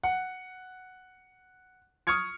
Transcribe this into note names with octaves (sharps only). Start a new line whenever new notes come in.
F#5
C#6 D#6 F6 G#6 C#7